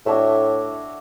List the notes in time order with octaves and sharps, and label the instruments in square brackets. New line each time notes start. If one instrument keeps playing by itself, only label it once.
[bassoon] A2 [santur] D4 F#4 C#5 E5